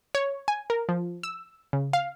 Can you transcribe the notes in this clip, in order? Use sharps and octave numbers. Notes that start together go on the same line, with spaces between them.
C#5
G#5
A#4
F3
E6
C#3
F5